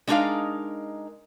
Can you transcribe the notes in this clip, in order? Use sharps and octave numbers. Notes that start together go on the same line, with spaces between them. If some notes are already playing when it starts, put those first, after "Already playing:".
G#3 D4 D#4 G4 A#4 F5